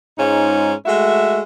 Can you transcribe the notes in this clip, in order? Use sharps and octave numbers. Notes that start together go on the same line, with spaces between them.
G#2 G#3 C#4 D#4 F4
G#3 A3 F#4 E5